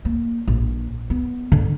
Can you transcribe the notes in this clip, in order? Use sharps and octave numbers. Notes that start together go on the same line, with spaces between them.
A#3
A#1
B3
D3